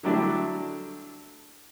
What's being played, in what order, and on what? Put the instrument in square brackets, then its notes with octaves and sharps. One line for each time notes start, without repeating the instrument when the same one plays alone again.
[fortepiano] D3 F#3 G3 A3 D4 E4